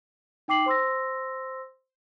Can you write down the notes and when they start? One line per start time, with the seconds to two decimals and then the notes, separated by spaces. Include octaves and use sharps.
0.48 D#4 G5 D6 C7 F#7
0.66 C5 C6 E6 A#6